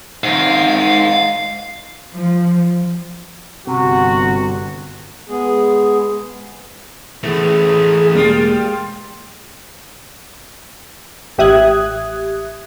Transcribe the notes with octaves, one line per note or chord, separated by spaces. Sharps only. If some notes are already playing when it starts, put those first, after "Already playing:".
G#2 A#4 F5
F3
G1 C3 F#4
G#3 B3 G#4
E3 A3 B3 G#4
E1 G3 G#3 A#3 F4 G4
A1 G4 E5 D#6 F#6 G#6